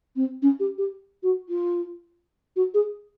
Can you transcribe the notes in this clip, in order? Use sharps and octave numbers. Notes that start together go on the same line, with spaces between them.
C4
C#4
G4
G4
F#4
F4
F#4
G#4